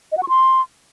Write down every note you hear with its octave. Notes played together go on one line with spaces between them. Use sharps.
D#5
F#5
C#6
C6